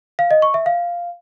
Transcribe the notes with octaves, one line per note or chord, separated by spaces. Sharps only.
F5
D#5
C#6
E5
F5